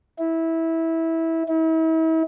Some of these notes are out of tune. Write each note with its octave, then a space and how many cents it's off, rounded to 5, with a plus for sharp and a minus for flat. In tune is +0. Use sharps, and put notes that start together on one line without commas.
E4 -15
E4 -40